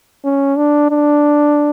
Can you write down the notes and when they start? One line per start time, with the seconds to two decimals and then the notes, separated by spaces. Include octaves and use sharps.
0.24 C#4
0.56 D4
0.90 D4